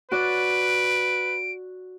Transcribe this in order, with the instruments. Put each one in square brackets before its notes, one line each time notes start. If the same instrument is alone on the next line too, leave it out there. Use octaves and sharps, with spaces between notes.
[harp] F#4 D5 [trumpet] B4 [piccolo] D7